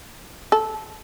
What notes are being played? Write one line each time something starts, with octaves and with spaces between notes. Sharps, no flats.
A4